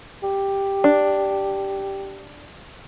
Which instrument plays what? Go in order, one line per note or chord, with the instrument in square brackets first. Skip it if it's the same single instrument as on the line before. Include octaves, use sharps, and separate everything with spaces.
[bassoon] G4
[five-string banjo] D4